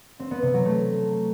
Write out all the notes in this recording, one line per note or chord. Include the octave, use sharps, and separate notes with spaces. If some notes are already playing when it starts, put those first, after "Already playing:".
C4
B3
C3
F#3
A3